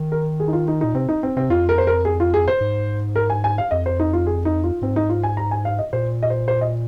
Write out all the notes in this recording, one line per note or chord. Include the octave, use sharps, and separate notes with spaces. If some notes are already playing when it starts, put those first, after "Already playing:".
Already playing: D#3
A#4
G#4
D#4
F4
D#4
A#2 D#4
C3 C4
D#4
C4
C3 C4
F2 F4
A#4
C5
A#4
G#4
F4
G#4
C5
G#2
A#4
G#5
G#5
F5
F2 D#5
C5
D#4
F4
G#4
D#4
F4
G#2 C4
D#4
F4
G#5
A#5
G#5
F5
D#5
A#2 C5
D#5
C5
C5
D#5